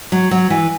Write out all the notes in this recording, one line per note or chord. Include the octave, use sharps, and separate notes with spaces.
F#3
F#3
E3